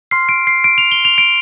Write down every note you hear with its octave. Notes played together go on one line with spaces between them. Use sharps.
C6 F6 C7
D7
C7
D7
F7
G7
F7
D7